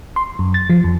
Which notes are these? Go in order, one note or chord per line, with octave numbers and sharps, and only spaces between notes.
C6
F#2
A6
F3
F2